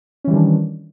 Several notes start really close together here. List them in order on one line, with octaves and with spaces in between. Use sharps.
C#4 E3 G3 D#3 D4